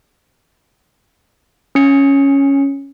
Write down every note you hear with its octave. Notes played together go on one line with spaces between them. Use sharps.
C#4 C#7